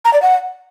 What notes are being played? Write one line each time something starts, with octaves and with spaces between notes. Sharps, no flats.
A#5
D5
F#5